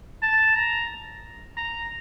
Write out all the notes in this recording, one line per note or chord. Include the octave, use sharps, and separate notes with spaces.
A5
A#5
A#5